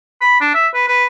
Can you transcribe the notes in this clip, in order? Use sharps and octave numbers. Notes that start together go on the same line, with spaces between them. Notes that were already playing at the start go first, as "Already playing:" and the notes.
B5
D4
E5
B4
B4